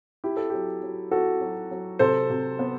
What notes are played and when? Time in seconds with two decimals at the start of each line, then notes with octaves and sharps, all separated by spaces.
0.24 E4 G4
0.37 A4
0.50 F#3 G4
0.83 F#3
1.11 E4 F#4 A4
1.41 F#3
1.71 F#3
1.99 C3 A4 C5
2.30 C3
2.59 B3